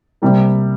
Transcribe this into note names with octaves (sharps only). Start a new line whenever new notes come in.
C3 G3 A#3